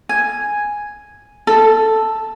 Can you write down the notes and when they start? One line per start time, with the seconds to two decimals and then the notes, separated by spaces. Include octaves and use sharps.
0.09 G#5
1.47 A4